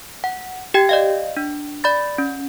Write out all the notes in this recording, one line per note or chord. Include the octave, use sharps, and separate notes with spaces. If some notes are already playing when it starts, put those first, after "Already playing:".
F#5
G4 G5 G#6
D5 D#5 F5
D4
D5 B5 A6
C#4